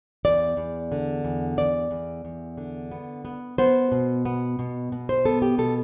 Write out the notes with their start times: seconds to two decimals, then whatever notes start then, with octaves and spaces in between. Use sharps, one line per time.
0.25 E2 D5
0.57 E2
0.92 D3
1.25 E2
1.57 E2 D5
1.91 E2
2.25 E2
2.58 D3
2.92 B3
3.25 B3
3.58 B3 C5
3.92 B2
4.25 B3
4.59 B2
4.92 B2
5.09 C5
5.25 B3 A4
5.42 G4
5.58 B2 A4